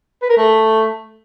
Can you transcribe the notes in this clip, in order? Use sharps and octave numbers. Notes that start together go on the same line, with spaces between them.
B4
A#4
A3